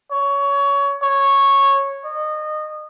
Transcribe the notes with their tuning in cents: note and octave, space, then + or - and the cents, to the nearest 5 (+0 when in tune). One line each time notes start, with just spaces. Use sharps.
C#5 +20
C#5 -10
D#5 -25